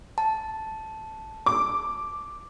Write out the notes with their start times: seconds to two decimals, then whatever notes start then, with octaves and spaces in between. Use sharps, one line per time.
0.18 A5
1.46 D6